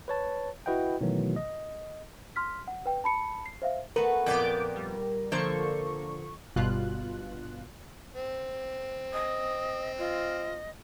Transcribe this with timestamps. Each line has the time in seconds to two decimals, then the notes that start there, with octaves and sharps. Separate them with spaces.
0.08 B4 C#5 A5
0.66 E4 F#4 B4 D#5 F#5 G5
1.01 B2 D#3 E3 F#3 A3 B3
1.36 D#5
2.36 C6 F6 B6
2.68 F#5
2.86 B4 G5
3.04 A5 B5 C#7
3.46 C7
3.62 C5 E5 F5
3.96 A3 B3 F#4 A#4 B4
4.26 F2 A#2 B3 D5 G5 D6
4.75 G3
5.32 D3 F3 A#3 A4 C5 C#6
6.56 G1 G2 B2 F4 F#6
8.16 C4
9.13 D#5 D#6
9.99 F4 D#5